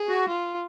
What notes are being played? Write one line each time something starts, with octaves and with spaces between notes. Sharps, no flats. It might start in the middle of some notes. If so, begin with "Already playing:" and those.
Already playing: G#4
F#4
F4